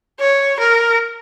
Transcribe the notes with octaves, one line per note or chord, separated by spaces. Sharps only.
C#5
A#4